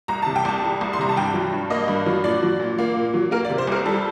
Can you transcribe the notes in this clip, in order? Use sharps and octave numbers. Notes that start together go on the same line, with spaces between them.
C2 A#5
C3 A5
G5
C2 A5
G3
C2
C6
C3 A#5
A5
G2 G5
F#3
G2
A#3 D#5
G2
F#3
A#2 D5
F#3
A#2
A#3
A#2
F#3
A#3 A#4
D5
C3
C5
C2 A#4
G3 A4